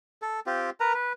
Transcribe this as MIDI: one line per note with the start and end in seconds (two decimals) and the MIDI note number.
0.22 0.40 69
0.47 0.70 60
0.47 0.70 65
0.47 0.70 67
0.80 0.93 70
0.80 0.93 71
0.80 0.93 82
0.94 1.13 71